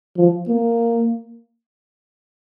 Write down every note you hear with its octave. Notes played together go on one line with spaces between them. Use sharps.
F3
A#3